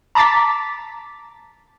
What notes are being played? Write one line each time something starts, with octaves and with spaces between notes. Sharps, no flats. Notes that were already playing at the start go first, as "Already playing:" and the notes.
A5 A#5 D6 A6 B6